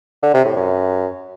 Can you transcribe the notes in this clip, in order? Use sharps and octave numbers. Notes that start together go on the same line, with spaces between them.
D3
C3
A2
F#2